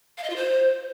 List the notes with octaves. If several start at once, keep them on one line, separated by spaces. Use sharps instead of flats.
F5
D#5
F4
C5